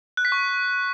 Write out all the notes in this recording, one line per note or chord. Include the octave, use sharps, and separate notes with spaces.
F#6
B6
C#6